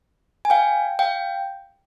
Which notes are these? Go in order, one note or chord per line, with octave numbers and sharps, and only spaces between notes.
G#5
F5 G5
F5 G5